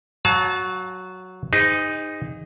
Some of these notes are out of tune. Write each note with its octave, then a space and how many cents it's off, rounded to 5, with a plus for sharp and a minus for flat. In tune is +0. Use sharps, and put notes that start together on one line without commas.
F#3 +0 F5 +40 A5 -25
D#4 +0 G#4 -40 C5 -40